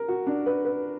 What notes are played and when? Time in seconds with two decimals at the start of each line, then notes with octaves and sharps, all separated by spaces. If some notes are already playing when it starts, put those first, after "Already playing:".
Already playing: A#4
0.08 F#4
0.27 D4
0.46 B4
0.65 B4